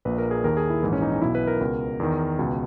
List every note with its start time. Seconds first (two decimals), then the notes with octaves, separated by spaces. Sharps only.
0.05 A#1 A#2 B4
0.18 A#4
0.31 G#4
0.44 D#2 D#3 A#4
0.57 G#4
0.70 E4
0.83 A#1 G#2 E3
0.93 C#4
1.02 D#4
1.12 D#4
1.22 B1 B2 E4
1.35 B4
1.47 A#4
1.61 C#2 B2
2.00 E2 D#3
2.39 C#2 B2